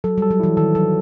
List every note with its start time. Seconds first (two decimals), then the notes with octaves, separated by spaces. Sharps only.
0.04 F#3 A4
0.18 G3 A4
0.31 F#3
0.40 E3 E4
0.57 D#3 A4
0.75 F#3 A4